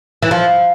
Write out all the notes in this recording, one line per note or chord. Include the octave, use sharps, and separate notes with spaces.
E3
F3